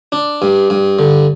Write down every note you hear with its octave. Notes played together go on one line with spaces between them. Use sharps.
D4
G2
G2
D3